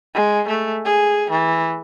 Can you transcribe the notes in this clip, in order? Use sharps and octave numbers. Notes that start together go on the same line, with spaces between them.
G#3
A3
G#4
E3